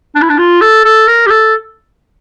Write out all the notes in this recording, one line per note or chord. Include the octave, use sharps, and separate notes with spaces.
D4
E4
D4
F4
A4
A4
A#4
G4
A4